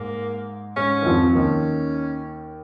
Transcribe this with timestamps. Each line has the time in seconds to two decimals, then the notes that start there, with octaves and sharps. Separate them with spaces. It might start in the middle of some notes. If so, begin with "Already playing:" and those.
Already playing: G#2 G#3 A#3
0.77 G#2 G#3 C#4
1.02 D#3
1.06 F2 F3
1.35 D#2 D#3 C#4